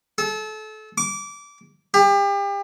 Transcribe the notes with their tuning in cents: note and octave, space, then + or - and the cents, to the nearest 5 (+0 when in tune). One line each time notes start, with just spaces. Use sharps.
A4 -30
D6 -25
G4 +35